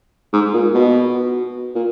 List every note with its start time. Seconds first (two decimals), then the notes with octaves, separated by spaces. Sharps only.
0.33 G#2
0.53 A#2
0.75 B2
1.75 A#2